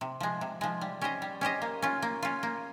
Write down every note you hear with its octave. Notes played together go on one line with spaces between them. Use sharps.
C3
F3 G#3
C3
F3 G#3
G3
C#4 G4 C5 D#5
G3
C#4 G4 C5 D#5
A#3
C#4 F4
A#3
C#4 F4
A#3